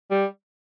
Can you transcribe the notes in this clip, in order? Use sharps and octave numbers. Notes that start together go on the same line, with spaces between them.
G3